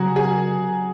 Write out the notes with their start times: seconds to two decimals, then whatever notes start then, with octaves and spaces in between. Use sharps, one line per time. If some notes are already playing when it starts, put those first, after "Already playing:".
Already playing: C#3 F#3 F#4 G#4 A#4
0.16 G#4